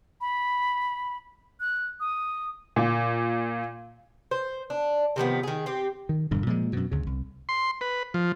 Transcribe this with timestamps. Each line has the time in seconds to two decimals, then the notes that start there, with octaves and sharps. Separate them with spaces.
0.21 B5
1.60 F#6
2.00 D#6
2.76 A#2
4.31 C5
4.70 D4
5.16 C3 D#3 F3 B3
5.43 D#3 G#4
5.66 C4 G4
6.09 D#3
6.31 E1 G2 D3
6.47 A#2 F3 G3 G#3
6.73 F#2 B2
6.91 D2 C#3
7.07 C2
7.49 C6
7.81 B4
8.14 F3